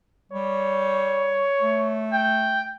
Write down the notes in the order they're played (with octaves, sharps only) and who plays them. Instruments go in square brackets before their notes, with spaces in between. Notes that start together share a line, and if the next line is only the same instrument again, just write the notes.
[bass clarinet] G3 [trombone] C#5
[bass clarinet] A3
[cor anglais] G5